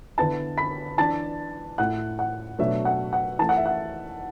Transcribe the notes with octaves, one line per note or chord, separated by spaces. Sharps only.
D3 B3 E4 A5 A6
B5 B6
E3 D4 A5 A6
A2 A3 E4 F#5 F#6
F#5
B2 F#3 A3 D4 E5
F#5
F#5
E3 A3 E4 A5
F#5
E5
F#5